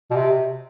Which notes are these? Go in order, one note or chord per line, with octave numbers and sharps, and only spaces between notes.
B2
C3